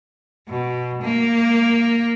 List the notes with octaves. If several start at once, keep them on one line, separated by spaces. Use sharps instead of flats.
B2
A#3